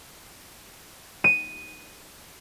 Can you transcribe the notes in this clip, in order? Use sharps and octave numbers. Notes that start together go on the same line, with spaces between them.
D#7